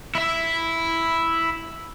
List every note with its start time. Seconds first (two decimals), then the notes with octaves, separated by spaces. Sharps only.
0.15 E4 E5